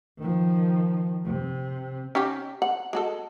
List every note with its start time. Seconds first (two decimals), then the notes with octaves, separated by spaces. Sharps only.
0.18 D#3 F3
1.25 C3
2.15 C#4 D#4 G4
2.62 F#5
2.93 G#3 F#4 A4